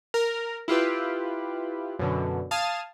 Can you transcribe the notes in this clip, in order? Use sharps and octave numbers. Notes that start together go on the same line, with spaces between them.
A#4
E4 F4 G4 B4
F#2 B2 D3
F5 A5 D#6 G#6 D#7